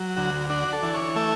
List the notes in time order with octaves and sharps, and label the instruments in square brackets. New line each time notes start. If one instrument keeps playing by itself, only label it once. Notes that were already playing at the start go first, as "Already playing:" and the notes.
Already playing: [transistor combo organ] F#3
D2 F#4
D4 F#4
A4
E3
C#5
A3 E5